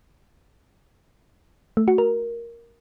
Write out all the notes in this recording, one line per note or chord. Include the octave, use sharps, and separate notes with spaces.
A3
F#4
A#4